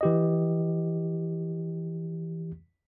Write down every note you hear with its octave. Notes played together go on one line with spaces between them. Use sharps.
E3 G4 D#5